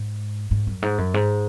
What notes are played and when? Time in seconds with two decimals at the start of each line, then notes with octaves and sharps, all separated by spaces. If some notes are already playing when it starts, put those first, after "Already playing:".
Already playing: G#2
0.51 G#2
0.67 F#2
0.82 G#2
0.98 F#2
1.14 G#2